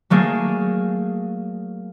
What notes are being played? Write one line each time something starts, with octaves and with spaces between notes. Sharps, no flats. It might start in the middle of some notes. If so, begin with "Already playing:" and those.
F#3 A3 A#3 G#4